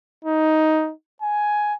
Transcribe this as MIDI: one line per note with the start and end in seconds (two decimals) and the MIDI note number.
0.25 0.92 63
1.22 1.74 80